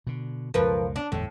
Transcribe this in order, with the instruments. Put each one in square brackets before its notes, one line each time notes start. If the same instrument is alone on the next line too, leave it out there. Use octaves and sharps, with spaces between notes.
[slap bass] B2 D3
[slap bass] C#2 F#2 B2 [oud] F3 A#4 B4
[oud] D4
[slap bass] G1 E2 G#3 [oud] A2